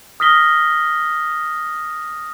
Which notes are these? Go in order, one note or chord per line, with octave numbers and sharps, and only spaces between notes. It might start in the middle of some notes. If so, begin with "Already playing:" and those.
D#6 F6 A#6 B6 G7